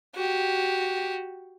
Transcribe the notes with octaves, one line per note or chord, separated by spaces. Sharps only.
F#4 G4